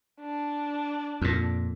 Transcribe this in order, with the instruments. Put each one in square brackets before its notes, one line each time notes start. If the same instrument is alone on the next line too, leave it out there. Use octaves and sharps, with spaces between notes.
[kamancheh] D4
[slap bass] F2 A#2